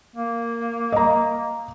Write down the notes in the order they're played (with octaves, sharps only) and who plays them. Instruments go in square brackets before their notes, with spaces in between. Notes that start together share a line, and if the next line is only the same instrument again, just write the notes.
[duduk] A#3
[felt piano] D#5 A#5